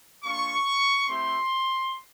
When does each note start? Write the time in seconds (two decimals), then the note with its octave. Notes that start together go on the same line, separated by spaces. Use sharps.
0.24 A#3 D4 F4 C#6
1.07 A3 C4 E4 G4 C6